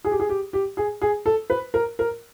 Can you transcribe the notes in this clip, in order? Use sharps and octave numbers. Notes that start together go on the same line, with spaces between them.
G#4
G4
G#4
G4
G4
G#4
G#4
A4
B4
A#4
A#4